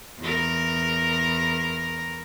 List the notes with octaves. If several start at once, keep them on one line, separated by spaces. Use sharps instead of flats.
E2 A#4